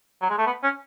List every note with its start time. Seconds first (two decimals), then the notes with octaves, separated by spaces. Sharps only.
0.21 F#3
0.30 G#3
0.38 A3
0.46 B3
0.63 C#4